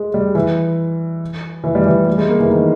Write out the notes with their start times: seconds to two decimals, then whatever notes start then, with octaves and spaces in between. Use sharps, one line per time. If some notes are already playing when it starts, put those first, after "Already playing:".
Already playing: G#3
0.14 G3
0.35 E3
1.64 E3
1.75 G3
1.86 E3
2.07 G3
2.18 G#3
2.29 A#3
2.40 E3
2.50 D#3